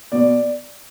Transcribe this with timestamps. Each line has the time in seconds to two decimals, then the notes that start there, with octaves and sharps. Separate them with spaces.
0.12 B2 D5